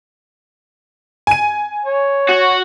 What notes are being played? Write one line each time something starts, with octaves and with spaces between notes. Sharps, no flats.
G#5 D#7
C#5
F#4